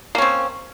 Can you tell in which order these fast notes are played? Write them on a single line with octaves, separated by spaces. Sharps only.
A#3 C#4 C4